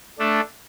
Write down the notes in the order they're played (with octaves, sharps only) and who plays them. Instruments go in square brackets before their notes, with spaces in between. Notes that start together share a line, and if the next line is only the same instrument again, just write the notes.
[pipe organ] A3 D4